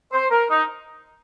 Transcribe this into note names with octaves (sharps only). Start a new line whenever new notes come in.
C5
A#4
D#4